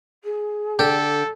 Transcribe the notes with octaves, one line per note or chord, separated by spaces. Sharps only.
G#4
D3 G4 A4